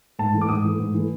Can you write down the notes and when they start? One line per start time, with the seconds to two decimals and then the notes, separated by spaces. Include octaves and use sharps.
0.19 G#2 A5
0.34 E3 A3
0.41 D6
0.49 G#2 D#6
0.64 E3 A3
0.79 G#2
0.94 E3 A3